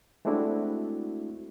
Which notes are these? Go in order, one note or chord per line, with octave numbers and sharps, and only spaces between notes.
G#3 A3 C4 D4 E4 F#4